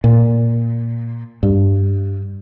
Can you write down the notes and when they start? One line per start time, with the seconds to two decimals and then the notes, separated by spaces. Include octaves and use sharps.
0.04 A#2
1.43 G2